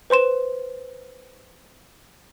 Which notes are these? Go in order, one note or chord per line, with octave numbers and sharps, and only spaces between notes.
B4 C5 C6 E7